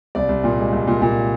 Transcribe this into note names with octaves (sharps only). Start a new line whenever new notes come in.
C2 D5
C2
A#2
G#3
C2
A#2
A#2